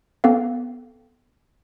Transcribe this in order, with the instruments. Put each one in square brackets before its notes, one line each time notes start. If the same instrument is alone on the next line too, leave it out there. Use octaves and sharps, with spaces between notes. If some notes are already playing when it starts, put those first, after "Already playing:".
[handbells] B3 C4 A4 F5